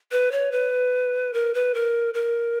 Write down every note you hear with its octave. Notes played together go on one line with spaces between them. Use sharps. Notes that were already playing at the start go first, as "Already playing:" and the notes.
B4
C#5
B4
A#4
B4
A#4
A#4